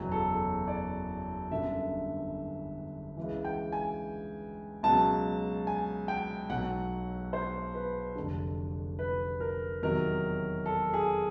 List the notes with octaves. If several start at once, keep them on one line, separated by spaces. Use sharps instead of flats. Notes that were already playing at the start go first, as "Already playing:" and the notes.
Already playing: F#1 E2 B2 F#3
A4
D5
G1 F#2 D3 E5
C#2 C#3 E3
G5
G#5
C#2 B2 F#3 A5
G#5
G5
B1 B2 F#3 F#5
C5
B4
F1 F2 D3
B4
A#4
E2 C3 D#3 F#3 A#4
A4
G#4